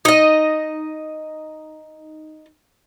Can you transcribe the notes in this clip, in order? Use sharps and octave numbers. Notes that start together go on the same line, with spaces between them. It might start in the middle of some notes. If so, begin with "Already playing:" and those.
D#4 D#5